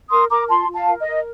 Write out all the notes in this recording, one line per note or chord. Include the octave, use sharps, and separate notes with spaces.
A#4 C6 D#6
A#4 A#5 D6
F4 A5 C6
F4
F5 A5
A#4
D#5
A#4